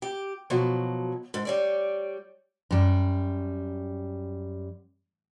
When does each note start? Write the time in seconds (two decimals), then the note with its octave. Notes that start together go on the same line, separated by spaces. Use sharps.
0.02 G4
0.50 B2 F3 F#3
1.34 G#2
1.45 G3 C#5 D5
2.71 F#2 G3